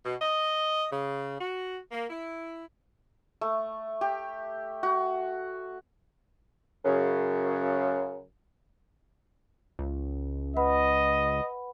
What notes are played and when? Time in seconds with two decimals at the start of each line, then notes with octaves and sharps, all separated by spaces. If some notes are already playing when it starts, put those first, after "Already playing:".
0.04 B2
0.20 D#5
0.91 C#3
1.40 F#4
1.91 A#3
2.09 E4
3.41 A3
4.01 G4
4.83 F#4
6.85 F#2 C#3
9.79 C#2
10.57 B4 D#5 F#5 B5